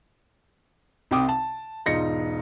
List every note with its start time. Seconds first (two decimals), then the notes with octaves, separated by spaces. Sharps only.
1.11 C2 C3 G5 D6 D#6
1.29 A5
1.86 E1 G#2 D#4 F4 A#6 C#7